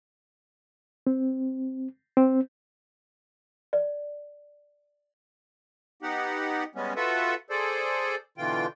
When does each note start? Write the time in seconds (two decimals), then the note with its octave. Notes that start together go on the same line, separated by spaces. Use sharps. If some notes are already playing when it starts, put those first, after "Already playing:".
1.07 C4
2.17 C4
3.73 D5
6.02 B3 D#4 G4 F#5
6.75 G3 G#3 B3 C#4
6.96 F4 F#4 A4 B4 E5 F#5
7.50 G#4 A4 C5 D5
8.38 B2 D3 E3 F4 G5